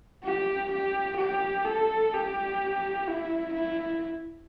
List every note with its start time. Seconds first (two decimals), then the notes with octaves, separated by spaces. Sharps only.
0.24 G4
0.72 G4
1.18 G4
1.65 A4
2.13 G4
3.07 E4
3.54 E4